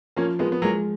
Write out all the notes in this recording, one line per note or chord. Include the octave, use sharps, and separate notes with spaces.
F3 A#3 C#4
F3 G#3 B3
B3
F#3 G#3 A#3